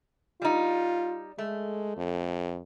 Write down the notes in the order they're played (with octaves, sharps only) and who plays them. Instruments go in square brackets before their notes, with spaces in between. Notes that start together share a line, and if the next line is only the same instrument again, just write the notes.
[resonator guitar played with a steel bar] G3 D#4 [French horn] F4
[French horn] G#3 [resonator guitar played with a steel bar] A3
[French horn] F2